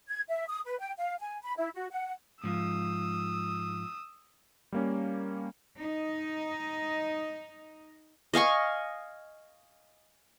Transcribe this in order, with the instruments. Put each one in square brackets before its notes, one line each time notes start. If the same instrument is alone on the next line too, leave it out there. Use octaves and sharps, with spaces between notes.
[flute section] G#6
E5
D#6
B4
G5
F5
G#5
B5
E4
F#4
F#5
[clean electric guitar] G#2 F3 [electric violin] D#6 E6
[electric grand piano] G3 A#3 C#4
[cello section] D#4 D#5
[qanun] D#5 F5 G#5 C#6